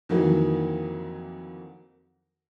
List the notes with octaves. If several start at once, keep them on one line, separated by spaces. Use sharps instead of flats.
F2 D#3 E3 F#3 A#3